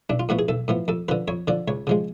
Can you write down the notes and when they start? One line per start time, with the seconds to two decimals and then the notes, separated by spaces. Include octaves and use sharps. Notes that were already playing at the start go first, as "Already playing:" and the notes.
0.10 B1 D4
0.20 F4
0.29 A2 F3 B3 F#4
0.39 G#4
0.49 B1 A4
0.68 A2 F3 B3
0.88 F2 A4
1.08 D3 F3 B4
1.28 F2 C#5
1.48 D3 F3 D5
1.68 C#2 C#5
1.87 C#3 F3 G#3